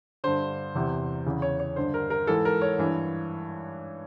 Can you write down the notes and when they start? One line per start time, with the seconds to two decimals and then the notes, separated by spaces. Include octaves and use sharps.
0.24 G2 D3 C5
0.75 E2 C3 E3
1.26 E2 C#3 E3
1.42 C#5
1.60 C#5
1.76 G2 D3 C5
1.94 A#4
2.10 A#4
2.27 G#2 E3 A4
2.45 A#4
2.61 C#5
2.78 G2 E3